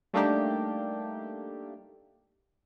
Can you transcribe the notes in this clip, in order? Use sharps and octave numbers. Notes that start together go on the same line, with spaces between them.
G3 A3 A#3 D4 D#4 G4